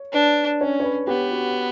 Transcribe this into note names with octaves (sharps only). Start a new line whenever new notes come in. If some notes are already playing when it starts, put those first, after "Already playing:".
Already playing: C#5
D4 B4
C#4 C#5
C#5
B4
B3 G4
F#4